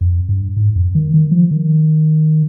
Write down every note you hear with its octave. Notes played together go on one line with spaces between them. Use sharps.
F2
G2
G#2
F2
D#3
D#3
F3
D#3